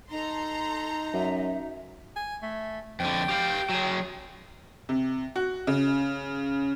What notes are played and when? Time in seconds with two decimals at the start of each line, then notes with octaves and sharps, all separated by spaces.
0.11 D#4 A4 A#5 C6
1.13 F#2 E5
2.16 G#5
2.43 A3
3.00 F2 D3 G5
3.29 G4 F5
3.69 F#3 G#4
4.89 C3
5.36 F#4
5.67 C#3